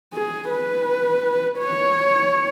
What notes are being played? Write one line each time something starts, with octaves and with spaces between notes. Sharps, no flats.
G#4
B4
C#5